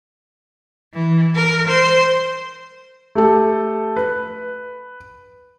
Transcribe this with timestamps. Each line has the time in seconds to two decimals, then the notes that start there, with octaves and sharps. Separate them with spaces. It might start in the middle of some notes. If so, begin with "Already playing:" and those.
0.94 E3
1.35 A#4
1.67 C5
3.15 A3 G4 A4
3.96 B4